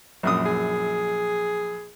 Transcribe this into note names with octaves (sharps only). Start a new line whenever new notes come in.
A#1 F#2 D#6
G#4